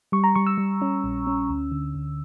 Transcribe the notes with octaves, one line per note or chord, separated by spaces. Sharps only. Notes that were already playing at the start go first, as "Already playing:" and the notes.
G3 C#6
A#5
G3 C#6
E6
G3
C#4
A#1
C#4
D2
D3
D2